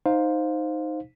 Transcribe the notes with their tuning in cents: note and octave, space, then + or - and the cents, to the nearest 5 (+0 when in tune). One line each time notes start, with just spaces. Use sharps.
D#4 +0 C5 +0 F5 +15